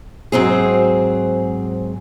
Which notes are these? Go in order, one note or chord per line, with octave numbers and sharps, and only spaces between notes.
G#2 F#3 C4 G#4